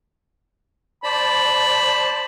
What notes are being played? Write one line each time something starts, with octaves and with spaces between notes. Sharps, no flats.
C5 D5 A5 B5